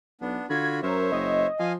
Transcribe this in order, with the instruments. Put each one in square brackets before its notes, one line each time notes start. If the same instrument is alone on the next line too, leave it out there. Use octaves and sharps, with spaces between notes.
[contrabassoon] B1 [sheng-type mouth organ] B3 D4
[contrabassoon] D3 [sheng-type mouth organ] F4 F#4 B5 [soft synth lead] G#6
[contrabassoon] F#2 [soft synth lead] A#4 [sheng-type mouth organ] C5 C#5 E5
[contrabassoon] F#1 [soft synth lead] D#5
[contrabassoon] F3 [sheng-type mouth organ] D#5 F5 G#5